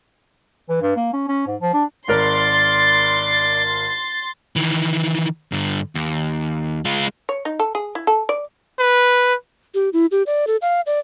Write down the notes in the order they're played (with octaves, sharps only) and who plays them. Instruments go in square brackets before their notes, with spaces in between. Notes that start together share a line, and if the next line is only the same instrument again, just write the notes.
[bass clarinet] E3
G2
A#3
C#4
C#4
G#2
F3
D4
[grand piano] G#1 A#4 [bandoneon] D5 [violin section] C6 A6
[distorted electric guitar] D#3 E3
G2 D3
D#2
G#3 F4
[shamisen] C#5
D#4
A4
G#4
E4
A4
D5
[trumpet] B4
[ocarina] G4
E4
G4
D5
A4
F5
D5